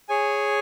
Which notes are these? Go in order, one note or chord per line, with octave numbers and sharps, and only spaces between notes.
G#4 C#5 G#5